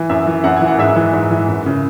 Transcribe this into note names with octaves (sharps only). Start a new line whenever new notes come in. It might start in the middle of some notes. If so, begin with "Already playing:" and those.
Already playing: E3
F#2 E5
E3
F#2 F#5
E3 G#5
F#5
G#2 E5
E3
G#2
E3
F#2
C#3